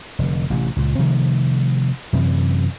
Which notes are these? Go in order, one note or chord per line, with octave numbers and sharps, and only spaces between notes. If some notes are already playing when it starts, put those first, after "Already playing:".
F1 D3
A1 C3
C#2 A#2
C3 D#3 F3 A3
F#2 C3 E3